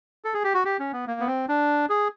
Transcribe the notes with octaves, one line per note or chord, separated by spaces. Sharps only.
A4
G#4
G4
F#4
G4
C#4
B3
A#3
B3
C4
D4
G#4